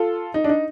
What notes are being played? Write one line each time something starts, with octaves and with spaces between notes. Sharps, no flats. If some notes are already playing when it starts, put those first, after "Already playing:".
Already playing: F4 A4
D#4
D4
D#4